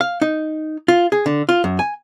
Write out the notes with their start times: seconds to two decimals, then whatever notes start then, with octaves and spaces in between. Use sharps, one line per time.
0.01 F5
0.22 D#4
0.88 F4
1.12 G#4
1.26 D3
1.49 F4
1.64 F#2
1.79 G#5